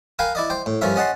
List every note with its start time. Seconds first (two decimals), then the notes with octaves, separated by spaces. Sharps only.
0.19 A#4 B4 F5 G5 G#5
0.35 E4 D5 D#5
0.50 C5 G5
0.66 A2
0.81 G2 F3 C#4 A#4 E5
0.96 C#4 D#5 F#5 A5 C6